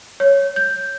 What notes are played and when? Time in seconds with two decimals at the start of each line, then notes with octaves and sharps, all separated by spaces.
0.20 C#5
0.56 G6